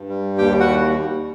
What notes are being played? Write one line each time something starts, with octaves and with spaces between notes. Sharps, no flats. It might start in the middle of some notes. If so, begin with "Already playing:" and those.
Already playing: G2
G3
D#2 G4 G5
F#4 F#5